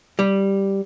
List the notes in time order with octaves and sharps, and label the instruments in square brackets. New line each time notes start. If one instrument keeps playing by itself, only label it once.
[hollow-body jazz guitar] G3